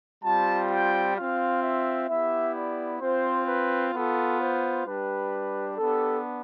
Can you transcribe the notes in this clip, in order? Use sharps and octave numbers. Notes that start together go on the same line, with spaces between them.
G3 C4 F4 A5
G5
C4 F4 F5
E5
B3 E4 G4 E5
D5
C4 F4 C5
B4
B3 F4 A4
C5
G3 D4 G4 B4
B3 D4 G4 A4